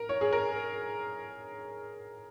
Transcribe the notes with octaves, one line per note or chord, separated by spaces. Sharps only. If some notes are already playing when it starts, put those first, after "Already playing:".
Already playing: A#4
C#5
G#4
A#4